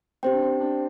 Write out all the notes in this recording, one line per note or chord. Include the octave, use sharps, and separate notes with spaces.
C4 G4 C5 G5
D4
C4
D4